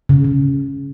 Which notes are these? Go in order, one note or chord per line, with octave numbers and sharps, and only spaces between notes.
C#3
C#3